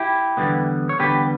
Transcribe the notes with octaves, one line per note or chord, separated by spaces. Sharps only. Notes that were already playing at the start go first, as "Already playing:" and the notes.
Already playing: E4 G4
E2 D3 G3 B3
C#5
E2 D3 G3 B3 G4 B4